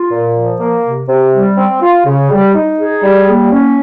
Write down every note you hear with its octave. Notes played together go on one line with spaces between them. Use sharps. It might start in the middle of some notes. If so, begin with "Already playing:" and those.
Already playing: F4
A#2
F3
A#3
C3
C3
G3
C4
F4
C#3
G3
D#4
G#4
G3
A#3
C#4